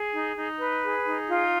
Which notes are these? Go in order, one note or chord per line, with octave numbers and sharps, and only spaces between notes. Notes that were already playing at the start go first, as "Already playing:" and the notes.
Already playing: G#4
D#4
D#4
B4
G#4
D#4
F4